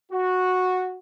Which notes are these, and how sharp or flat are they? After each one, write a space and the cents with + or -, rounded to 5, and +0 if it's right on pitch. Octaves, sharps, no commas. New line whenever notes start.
F#4 -10